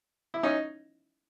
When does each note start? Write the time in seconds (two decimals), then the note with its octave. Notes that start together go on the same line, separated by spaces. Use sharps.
0.34 E4
0.43 C#4 D#4